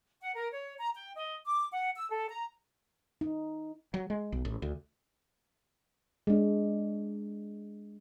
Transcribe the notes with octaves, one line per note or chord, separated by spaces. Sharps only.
F#5
A#4
C#5
A#5
G5
D#5
D6
F#5
E6
A4
A#5
D#4
F#3
G#3
B1
A1
D2
G#3 D4